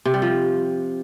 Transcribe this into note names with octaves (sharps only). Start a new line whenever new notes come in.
C3
G3
F3